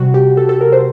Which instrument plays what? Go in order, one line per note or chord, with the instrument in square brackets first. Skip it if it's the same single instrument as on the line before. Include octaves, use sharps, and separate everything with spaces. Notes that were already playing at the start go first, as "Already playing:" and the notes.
Already playing: [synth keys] C3 G3 F#4
G4
A4
A4
A#4
C5